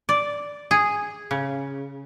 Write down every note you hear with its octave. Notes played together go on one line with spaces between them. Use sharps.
D5
G#4
C#3